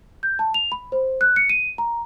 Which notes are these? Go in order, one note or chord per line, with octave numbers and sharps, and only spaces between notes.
G6
A5
F7
B5
C5
F#6
C#7
D#7
A#5